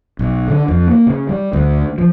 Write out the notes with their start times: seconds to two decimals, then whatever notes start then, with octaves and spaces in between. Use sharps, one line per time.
0.19 B1
0.48 D3
0.68 F2
0.87 A#3
1.07 C#3
1.29 G3
1.53 D2
1.98 F3